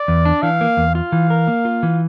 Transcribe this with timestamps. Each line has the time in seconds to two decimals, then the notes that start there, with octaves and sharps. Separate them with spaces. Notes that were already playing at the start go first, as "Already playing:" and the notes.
Already playing: D5
0.08 E2
0.25 D4
0.42 E3 F5
0.61 A#3
0.77 E2
0.95 F4 F5
1.12 E3
1.30 A#4
1.48 A#3
1.65 F4
1.83 E3